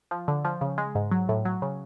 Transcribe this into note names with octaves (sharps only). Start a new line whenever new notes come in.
F3
D3
F3
C#3
G#3
G#2
F#3
A2
F#3
C#3